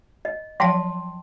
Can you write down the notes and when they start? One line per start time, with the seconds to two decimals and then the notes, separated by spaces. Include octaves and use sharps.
0.25 D#5
0.60 F3 F#3 F5 G5 A5 C6